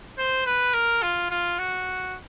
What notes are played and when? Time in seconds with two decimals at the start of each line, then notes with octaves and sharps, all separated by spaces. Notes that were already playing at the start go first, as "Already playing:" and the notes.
0.18 C5
0.46 B4
0.74 A#4
1.03 F4
1.31 F4
1.59 F#4